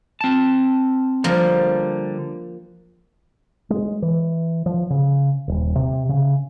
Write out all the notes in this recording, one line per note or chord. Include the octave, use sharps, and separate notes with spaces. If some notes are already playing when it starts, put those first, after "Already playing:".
C4 A5
D3 F3 G3 A#3
G#3
E3
F3
C#3
D#1
C3
C#3